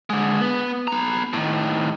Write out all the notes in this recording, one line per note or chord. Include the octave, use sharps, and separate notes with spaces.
D3 G#3
B3
B3 A#5
A2 D#3